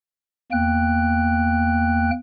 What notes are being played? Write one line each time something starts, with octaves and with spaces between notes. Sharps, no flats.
E2 A#3 G5 F#6